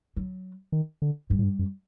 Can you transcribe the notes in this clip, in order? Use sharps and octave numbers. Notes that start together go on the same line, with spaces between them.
F#3
D#3
D3
G2 G3
A2
G2
F#2